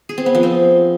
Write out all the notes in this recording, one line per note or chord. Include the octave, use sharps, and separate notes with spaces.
G#4
C4
B3
F3
C4